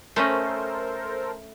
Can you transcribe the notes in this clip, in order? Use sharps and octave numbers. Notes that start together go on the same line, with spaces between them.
A3 C#4 A4 A#4 C5 D#5